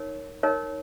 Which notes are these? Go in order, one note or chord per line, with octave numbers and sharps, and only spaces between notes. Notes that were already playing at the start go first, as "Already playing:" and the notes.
Already playing: D#4 A#4 C#5
D#4 A#4 C#5